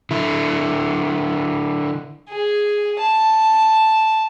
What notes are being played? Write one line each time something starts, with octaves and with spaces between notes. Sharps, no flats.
D3 E4
G#4
A5